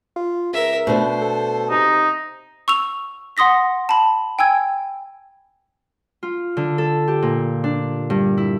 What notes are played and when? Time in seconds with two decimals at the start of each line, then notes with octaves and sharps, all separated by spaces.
0.16 F4
0.53 C#2 A#4 E5
0.87 B2 A3 D4 C5
1.21 A4
1.70 C3 D#4
2.68 C#6 E6 F7
3.37 F#5 C6 D#6 A#6 B6
3.89 A5 B5
4.39 G5 G#5 E6 G#6
6.23 F4
6.57 D3
6.78 A4
7.08 G4
7.22 A#2
7.64 D4
8.10 G2
8.37 E4